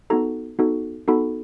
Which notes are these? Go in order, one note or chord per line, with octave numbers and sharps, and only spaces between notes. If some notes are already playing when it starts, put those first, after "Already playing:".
B3 D#4 F#4 A4 A#5
B3 D#4 F#4 A4
B3 D#4 F#4 A4 B5